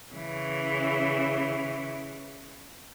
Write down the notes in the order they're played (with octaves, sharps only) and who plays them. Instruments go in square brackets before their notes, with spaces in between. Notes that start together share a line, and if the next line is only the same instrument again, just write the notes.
[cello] C#3 E3